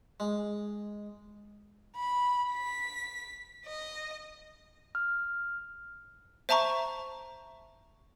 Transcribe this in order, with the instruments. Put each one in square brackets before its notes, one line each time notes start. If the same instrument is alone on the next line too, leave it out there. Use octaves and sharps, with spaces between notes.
[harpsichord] G#3
[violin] B5
B6
D#5
[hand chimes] F6
[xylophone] C5 E5 A5 A#5 C#6